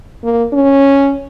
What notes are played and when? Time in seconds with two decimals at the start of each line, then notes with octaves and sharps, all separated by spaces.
0.24 A#3
0.53 C#4